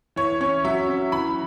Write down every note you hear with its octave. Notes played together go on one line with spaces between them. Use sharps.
E3 C#5
C#4 C#5
F#3 E5
C#4
E3 B5